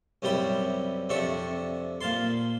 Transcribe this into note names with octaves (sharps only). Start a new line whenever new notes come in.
F#2 C3 G3 E4 B5
F2 C3 D4 E5 C#6
A#2 F5 A5 C6